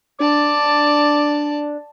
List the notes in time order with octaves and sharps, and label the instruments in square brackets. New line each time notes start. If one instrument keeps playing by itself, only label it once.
[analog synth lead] D4 [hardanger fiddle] D5 A5 [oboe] D6